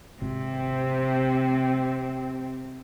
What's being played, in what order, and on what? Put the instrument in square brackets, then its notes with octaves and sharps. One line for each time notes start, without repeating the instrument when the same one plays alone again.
[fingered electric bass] G#1 [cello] C3 C4